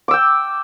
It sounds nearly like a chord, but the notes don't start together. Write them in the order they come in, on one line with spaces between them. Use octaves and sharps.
D6 E6 G5